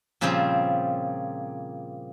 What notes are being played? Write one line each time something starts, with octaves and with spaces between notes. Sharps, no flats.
A#2 C#3 F3 G3 C4